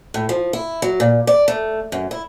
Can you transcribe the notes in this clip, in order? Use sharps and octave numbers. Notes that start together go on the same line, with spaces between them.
A2
F3
E4
F#3
A#2
D5
A3
F#2
E4